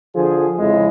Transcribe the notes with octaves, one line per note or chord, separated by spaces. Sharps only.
D3 F3 G#4
F2 C#3 G#3 E4